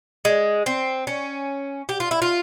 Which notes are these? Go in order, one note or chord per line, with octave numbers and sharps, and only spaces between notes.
G#3
C4
C#4
G4
F4
E4
F4